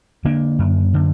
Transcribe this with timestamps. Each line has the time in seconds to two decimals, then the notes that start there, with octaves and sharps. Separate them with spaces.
0.25 D3 A#3 D4
0.59 F#2
0.94 D3